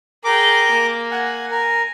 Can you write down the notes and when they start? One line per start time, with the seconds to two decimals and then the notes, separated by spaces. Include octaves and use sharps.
0.24 G#4 A#4 G5 D6
0.71 A#3
1.11 F#5 G#5
1.51 A#4 G#5